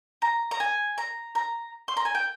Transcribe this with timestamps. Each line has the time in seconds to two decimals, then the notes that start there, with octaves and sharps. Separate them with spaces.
0.22 A#5
0.51 A#5
0.60 G#5
0.98 A#5
1.35 A#5
1.88 C6
1.97 A#5
2.05 G#5
2.15 G5